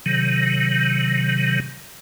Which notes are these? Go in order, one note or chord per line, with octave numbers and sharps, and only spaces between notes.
C3 D#3 F#3